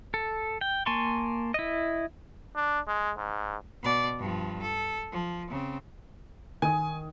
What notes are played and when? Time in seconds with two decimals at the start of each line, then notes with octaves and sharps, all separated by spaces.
0.14 A4
0.61 G5
0.86 A#3 G#5 A5 C6 C#6
1.54 E4 D#5
2.55 D4
2.87 G#3
3.17 G#2
3.83 B2 D5
4.19 G2 F3
4.62 A4
5.12 F3
5.50 C#3 C4
6.62 D#3 G#5 D#6